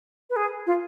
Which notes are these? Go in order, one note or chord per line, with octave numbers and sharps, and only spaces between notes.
B4
G#4
F4